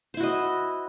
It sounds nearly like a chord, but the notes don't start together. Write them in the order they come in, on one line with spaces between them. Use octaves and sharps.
C5 E4 F#4 D#5